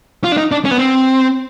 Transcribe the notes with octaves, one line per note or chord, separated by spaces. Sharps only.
F4
D4
D#4
D4
C#4
B3
C4